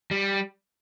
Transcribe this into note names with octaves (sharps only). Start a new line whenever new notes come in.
G3